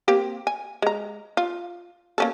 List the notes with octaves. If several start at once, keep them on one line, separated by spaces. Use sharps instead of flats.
A#3 C4 G4
G#5
G#3 A#5
F4
A#3 C#4 A4